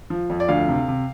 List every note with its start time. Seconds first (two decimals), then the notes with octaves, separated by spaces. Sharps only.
0.10 F3
0.30 F2
0.40 D5
0.48 D2 F5
0.68 C3
0.88 C3